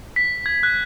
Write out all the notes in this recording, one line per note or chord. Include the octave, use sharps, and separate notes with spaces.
B6
G#6
F#6